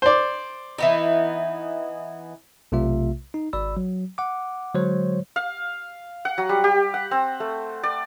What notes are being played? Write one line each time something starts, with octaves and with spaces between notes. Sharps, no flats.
C5 D5
E3 B3 D#4
B1 C3 A3 F4 E5
D#4
G#1 D5 B5 E6
F#3
F#5 D6
D3 F#3 G#3 C5 C#5
F5
F#5
F#3
G3
G4
F#5
C4
A3
D5